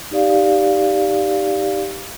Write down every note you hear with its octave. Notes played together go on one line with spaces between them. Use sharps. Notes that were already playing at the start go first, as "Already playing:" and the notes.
D#4 G4 D5 F5